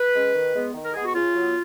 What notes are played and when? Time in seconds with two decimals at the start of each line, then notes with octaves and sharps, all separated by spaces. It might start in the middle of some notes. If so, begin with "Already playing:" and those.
Already playing: B4
0.14 G#3 C#4
0.34 D#3
0.54 G#3 B3
0.74 D#3
0.84 A#4
0.93 G#3 B3 G#4
1.05 F#4
1.14 C#3 F4
1.35 F#3 B3